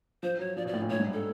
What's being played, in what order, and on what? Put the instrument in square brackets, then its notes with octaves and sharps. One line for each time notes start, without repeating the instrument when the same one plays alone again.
[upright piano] F3 [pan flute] C5
[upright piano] F#3 [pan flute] C#5
[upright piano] F3 [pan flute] D5
[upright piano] B2
[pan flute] D5
[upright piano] A2
A#2
[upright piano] A2 [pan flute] C#5
[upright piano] G#2
G2
[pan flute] A4